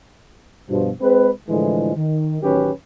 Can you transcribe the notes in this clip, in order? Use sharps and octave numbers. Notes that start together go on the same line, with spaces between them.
G2 B2 F3
G#3 C4 B4
A2 D3 E3 F3 G#3
D#3
A1 D#3 F#3 C#4 G4 B4